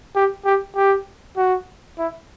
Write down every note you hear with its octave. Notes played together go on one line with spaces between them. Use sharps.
G4
G4
G4
F#4
E4